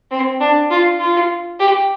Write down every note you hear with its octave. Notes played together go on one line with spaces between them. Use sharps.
C4
D4
F4
F4
G4